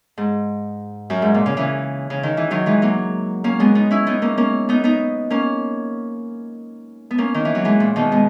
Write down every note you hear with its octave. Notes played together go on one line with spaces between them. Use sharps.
G#2
F#2
G#2
A#2
C#3
C#3 E3
C#3
D#3
E3
D#3 F#3
E3 G#3
F#3 A#3
A#3 C#4
G#3 B3
B3 D#4
C#4 E4
B3 D#4
A#3 C#4
A#3 C#4
B3 D#4
B3 D#4
A#3 C#4
B3
A#3 C#4
D#3
E3
F#3
E3 G#3
A#2
B2 D#3
G#3 B3